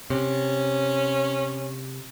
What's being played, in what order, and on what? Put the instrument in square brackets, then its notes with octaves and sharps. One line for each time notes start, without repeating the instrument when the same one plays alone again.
[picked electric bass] C3 [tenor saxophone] C#4